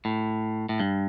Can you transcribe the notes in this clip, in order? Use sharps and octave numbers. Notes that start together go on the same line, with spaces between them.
A2
A2
G2